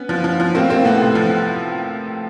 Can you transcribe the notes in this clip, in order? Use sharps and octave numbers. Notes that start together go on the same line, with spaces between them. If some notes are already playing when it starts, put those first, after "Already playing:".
Already playing: B3 C#4
F3
F3
F3
A2 A#3 C4
A2 A#3 C4
A2 A3 B3
C3
F3